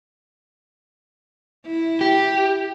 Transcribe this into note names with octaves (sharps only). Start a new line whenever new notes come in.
E4
G4